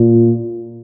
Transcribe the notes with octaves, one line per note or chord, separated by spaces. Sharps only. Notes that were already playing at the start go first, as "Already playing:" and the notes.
Already playing: A#2